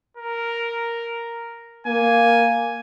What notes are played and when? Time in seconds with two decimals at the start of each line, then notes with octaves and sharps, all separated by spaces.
0.17 A#4
1.87 A#3 G#5